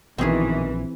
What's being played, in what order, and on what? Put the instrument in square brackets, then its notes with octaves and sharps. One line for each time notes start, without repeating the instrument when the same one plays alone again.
[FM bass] A#1 [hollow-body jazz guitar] B2 D#3 [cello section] E3 [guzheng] C4 G#4